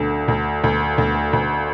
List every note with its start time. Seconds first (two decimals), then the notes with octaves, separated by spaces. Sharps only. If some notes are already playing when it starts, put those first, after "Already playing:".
Already playing: D2 D3
0.28 D2
0.64 D2
0.98 D2
1.33 D2